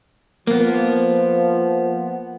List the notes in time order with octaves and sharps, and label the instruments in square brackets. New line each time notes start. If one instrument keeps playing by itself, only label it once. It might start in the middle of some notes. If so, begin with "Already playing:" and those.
[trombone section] F3 [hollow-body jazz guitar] A#3 B3